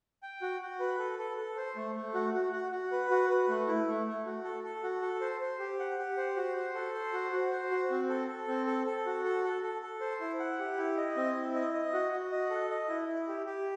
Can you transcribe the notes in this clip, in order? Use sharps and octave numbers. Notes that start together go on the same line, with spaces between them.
G5
F#4
F#4
B4
A4
A4
A4
C5
A3
A3
F#4
F#4
F#4
F#4
B4
F#4
B4
A3
E4
A3
A3
F#4
A4
A4
F#4
A4
C5
C5
G4
F#5
G4
C5
F#4
C5
A4
C5
F#4
F#4
C5
F#4
C4
A4
A4
C4
A4
A4
F#4
A4
A4
A4
A4
C5
E4
F#5
G4
E4
D#5
C4
E4
D#5
D#5
F#4
F#4
D#5
A4
D#5
E4
E4
G4
G4